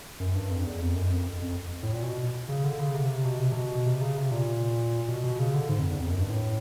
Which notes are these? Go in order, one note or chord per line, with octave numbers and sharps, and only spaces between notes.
F#2
G2
F2
E2
F2
F#2
F2
F2
A2
A#2
B2
C#3
D3
C#3
C3
B2
C3
B2
C3
C#3
C3
A#2
B2
B2
C#3
D3
G#2
F2
E2
F2
F#2
G2
A2